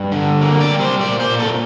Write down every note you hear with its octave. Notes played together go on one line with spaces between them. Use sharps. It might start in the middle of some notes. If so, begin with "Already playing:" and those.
Already playing: G2
D3
A#3
D5
G3
C5
A#2 D5
C5
A#2
A4